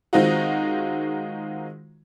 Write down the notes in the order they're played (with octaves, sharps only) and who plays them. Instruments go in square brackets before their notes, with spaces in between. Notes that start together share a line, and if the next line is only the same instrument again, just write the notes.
[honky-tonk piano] D#3 G#3 C4 D#4 F4 F#4